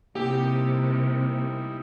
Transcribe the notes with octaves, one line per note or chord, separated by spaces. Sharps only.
C3 G3 A#3 D#4 E4 G4